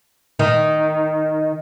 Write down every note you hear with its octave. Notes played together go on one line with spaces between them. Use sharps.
D#3